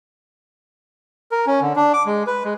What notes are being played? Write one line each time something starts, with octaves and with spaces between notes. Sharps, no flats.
A#4
C#4
D3
D4
D6
G#3
B4
G#3